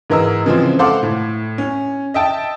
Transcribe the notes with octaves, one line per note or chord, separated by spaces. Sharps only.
G#2 E3 A#4 D#5 E6
C#3 E3 F3 G#3 C4
A4 C5 F5 F#5 C6 D6
A2
C#4
D#5 E5 G5 A5